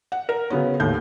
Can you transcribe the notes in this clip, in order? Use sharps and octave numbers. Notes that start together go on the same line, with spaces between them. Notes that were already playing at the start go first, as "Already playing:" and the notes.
F#5
A#4
C#3 F#3 B3 C#4
D#2 A2 G6